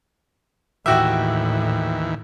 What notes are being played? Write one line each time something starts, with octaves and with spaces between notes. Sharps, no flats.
D#2 A2 E3 F#4 G4 E5